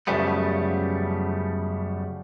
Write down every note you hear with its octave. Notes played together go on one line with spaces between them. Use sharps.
F#2 C#3 F3 G3 A3 B3